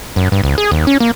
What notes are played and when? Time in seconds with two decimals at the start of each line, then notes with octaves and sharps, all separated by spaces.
0.16 F#2
0.32 G2
0.44 C#2
0.58 G#4
0.71 D#2
0.87 C#4
1.00 A#3